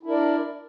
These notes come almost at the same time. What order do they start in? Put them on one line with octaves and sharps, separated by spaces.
E4 D4 A#4 D5